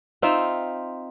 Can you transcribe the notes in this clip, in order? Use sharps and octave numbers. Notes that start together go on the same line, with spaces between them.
C4 D#4 F4 E5